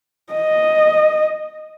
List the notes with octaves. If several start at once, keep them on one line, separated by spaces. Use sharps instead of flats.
D#5